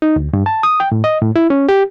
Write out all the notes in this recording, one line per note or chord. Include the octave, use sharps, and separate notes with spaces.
D#4
D2
G2
A5
D#6
G5
A2
D#5
A2
E4
C#4
G4